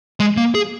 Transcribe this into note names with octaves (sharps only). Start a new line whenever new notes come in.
G#3
A#3
G#4